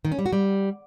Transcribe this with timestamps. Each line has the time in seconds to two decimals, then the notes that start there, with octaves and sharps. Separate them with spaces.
0.05 D#3
0.12 C#4
0.19 G3
0.26 F#4
0.33 G3